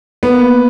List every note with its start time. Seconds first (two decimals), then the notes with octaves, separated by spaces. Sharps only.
0.23 A#3 B3